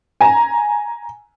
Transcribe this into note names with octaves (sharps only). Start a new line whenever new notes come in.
G#5 A#5